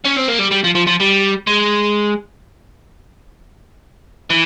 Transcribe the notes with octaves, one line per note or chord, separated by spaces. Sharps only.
C#4
C4
A#3
G3
G3
F3
F3
F3
G3
G#3
E3